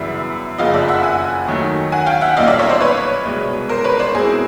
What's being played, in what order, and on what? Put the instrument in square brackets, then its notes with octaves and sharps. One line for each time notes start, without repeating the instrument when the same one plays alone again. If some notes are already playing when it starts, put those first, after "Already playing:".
Already playing: [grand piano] F#2 C#3 E3 G3 B3 [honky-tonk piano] E5
[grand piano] F#1 F2 C#3 F3 [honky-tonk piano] D#5 F5
[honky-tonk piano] D5 E5
E5 F#5
F#5 G#5
[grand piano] D#2 D#3 F#3 A3
[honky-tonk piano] F#5 G#5
F5 G5
E5 F#5
[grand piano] B1 A#2 G3 A#3 C#4 [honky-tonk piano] D#5 F5
[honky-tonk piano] D5 E5
C#5 D#5
C5 D5
B4 C#5
[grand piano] C2 B2 G#3
[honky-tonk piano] A#4 C5
B4 C#5
C5 D5
[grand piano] B2 G#3 C4 E4 [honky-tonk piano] G#4 A#4